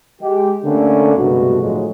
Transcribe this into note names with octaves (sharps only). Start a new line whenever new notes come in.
G#3 G4
D3 A3 A#3 C#4 D4
C2 G2 B2 G#3 A3 F#4
A2 D3 F3 F#3 G#3